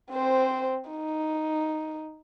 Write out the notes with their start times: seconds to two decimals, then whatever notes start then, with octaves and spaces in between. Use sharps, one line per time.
0.12 C4 C5
0.90 D#4